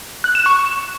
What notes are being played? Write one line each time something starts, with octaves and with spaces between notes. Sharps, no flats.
F#6
E7
C#6